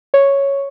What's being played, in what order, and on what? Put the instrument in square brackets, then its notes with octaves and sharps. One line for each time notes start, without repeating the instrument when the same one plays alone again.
[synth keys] C#5